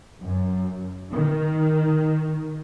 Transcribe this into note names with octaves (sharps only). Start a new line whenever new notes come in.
F#2
D#3